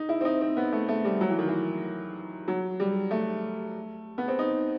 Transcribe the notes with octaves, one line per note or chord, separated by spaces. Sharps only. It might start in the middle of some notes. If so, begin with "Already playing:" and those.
Already playing: D#4
E4
C4
D#4
C4
B3
A3
A3
G3
F#3
E3
D#3
E3
F#3
G3
A3
B3
C4
D#4